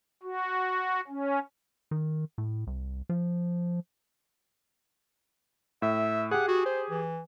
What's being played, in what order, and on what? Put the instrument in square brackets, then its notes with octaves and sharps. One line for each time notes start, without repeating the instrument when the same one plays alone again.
[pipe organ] F#4
C#4
[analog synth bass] D#3
A2
C2
F3
[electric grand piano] A2 [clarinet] E5
[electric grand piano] G4 G#4 [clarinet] F#5
[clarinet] F#4
C5
E3